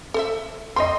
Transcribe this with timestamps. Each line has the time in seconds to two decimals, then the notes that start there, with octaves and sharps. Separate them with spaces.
0.14 A4 C5 E5
0.76 C4 C#5 D#5 C6